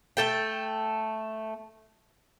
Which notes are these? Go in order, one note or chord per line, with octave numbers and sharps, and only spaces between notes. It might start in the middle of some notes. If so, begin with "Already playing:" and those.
A3 A4 G5